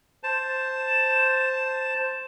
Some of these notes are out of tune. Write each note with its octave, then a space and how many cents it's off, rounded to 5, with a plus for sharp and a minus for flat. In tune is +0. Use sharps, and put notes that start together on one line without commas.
C5 +0 A5 +0